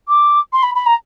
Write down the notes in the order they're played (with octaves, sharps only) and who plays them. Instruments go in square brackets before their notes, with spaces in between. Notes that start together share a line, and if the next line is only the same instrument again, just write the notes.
[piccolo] D6
C6
B5
B5
A#5